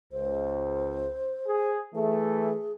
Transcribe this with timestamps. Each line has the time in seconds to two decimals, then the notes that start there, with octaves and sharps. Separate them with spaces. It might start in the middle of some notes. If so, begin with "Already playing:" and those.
0.12 C#2 C5
1.47 G#4
1.95 E3 A3 G#4